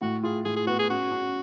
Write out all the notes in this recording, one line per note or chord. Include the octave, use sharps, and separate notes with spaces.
A2 F#4
F4 G#4
A2 G#4
G#4
B3 F#4
G#4
C#4 F#4
C#4